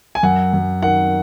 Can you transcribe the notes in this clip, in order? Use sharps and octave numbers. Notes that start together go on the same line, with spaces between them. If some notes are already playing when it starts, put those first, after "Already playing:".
G#5
F#2 F#5
F#2
D#3 F#5